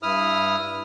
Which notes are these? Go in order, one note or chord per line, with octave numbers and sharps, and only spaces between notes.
G2 E4 D#6 F6